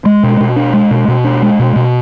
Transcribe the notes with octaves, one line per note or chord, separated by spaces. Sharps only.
G#3
B2
B2
D4
G#3
B2
B2
D4
G#3
B2
B2